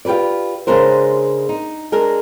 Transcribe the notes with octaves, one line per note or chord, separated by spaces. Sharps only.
F4 G4 A4 B4 D5
C#3 G#3 D4 A#4 C5
D#4
G#3 D4 A#4